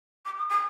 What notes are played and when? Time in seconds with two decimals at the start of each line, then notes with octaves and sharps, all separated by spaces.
0.25 D6
0.37 D#6
0.49 D#6